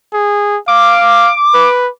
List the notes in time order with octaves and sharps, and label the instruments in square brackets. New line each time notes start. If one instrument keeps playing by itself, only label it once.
[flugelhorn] G#4
[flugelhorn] F5 [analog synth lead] D6
[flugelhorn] B4